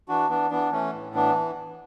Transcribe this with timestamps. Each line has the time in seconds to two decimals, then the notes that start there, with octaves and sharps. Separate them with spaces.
0.08 E3 D4 F#4
0.29 E3 B3 D4
0.51 E3 B3 D4
0.72 E3 A3 C#4
0.93 A2
1.14 E3 B3 D4